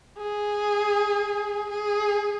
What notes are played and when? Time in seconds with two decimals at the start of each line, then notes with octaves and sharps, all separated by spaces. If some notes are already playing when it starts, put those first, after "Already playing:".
0.18 G#4
1.70 G#4